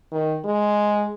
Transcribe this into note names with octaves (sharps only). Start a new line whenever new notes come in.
D#3
G#3